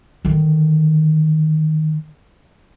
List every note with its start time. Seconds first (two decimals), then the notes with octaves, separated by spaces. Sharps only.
0.25 D3 D#3